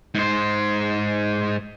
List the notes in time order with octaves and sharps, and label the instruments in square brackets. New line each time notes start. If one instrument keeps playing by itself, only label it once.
[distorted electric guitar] G#2 C5